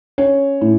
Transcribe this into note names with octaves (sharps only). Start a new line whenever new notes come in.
C#4 C#5
A2